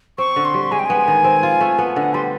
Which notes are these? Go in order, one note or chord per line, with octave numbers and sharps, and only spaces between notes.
C4 C#6
D3
C6
G3
G#3 G#5
G5
B3 G#5
D#3
C4
F4
A3
B3
D3 F#5
G3 C6